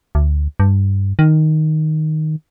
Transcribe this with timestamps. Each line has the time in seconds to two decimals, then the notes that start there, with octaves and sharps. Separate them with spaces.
0.15 D2
0.60 G2
1.19 D#3